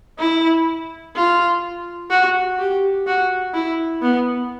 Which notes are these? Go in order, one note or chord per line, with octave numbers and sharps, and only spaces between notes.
E4
F4
F#4
G4
F#4
E4
B3